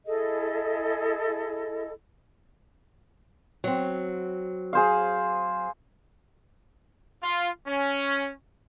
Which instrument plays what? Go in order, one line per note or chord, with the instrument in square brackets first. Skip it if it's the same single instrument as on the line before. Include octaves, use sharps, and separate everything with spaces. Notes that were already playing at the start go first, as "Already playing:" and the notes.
[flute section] E4 G#4 A4 D#5
[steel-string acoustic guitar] F#3 C4
[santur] G#4 C5 F5
[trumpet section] F4
C#4